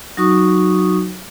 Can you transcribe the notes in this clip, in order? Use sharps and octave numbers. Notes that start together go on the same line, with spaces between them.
F#3 D#4 F#4 C#6 D#6